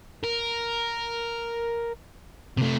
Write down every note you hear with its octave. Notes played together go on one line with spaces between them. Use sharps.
A#4
C3 A3